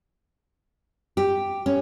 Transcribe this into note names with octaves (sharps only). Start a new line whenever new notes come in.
G4
C#4